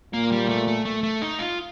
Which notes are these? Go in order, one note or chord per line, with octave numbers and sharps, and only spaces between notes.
A#2 A#3
G3
A3
A3
A3
A3
D#4
F4